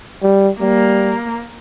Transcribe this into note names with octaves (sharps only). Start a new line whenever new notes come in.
G3
G3 A#3